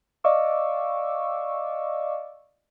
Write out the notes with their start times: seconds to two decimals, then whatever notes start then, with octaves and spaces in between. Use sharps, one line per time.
0.24 D5 D#5 F5 C#6 D6 E6